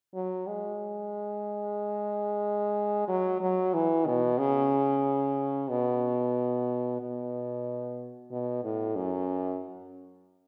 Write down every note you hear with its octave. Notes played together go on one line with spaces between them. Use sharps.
F#3
G#3
F#3
F#3
E3
B2
C#3
B2
B2
B2
A2
F#2